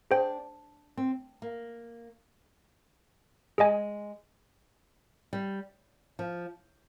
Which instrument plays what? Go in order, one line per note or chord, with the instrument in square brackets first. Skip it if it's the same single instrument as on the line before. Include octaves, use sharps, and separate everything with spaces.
[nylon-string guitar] D4 [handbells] G#4 C5 G5
[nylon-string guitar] C4
A#3
[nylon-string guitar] G#3 [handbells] G#4 D#5 G#5
[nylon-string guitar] G3
F3